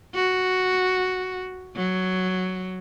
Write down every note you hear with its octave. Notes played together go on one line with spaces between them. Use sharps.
F#4
F#3